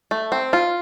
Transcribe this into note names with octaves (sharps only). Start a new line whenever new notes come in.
A3
C4
F4